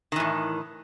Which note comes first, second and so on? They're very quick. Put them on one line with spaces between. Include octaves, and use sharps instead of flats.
D#3 E3 A2